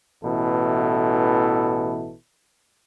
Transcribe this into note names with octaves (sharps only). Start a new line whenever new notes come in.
A1 B2 E3 E4 A4